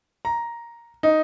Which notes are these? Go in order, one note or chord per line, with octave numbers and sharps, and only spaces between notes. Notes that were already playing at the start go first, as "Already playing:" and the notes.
A#5
D#4